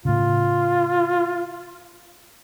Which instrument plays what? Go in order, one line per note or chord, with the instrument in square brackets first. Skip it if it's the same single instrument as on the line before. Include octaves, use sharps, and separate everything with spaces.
[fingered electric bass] A2 C#3 [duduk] F4